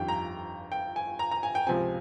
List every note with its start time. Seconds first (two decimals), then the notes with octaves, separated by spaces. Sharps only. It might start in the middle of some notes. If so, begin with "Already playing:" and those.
Already playing: G1 F2 D#3 G3 G5
0.08 A#5
0.72 G5
0.96 G#5
1.19 A#5
1.31 A#5
1.43 G#5
1.55 G5
1.67 C#2 C3 F3 C4 G#5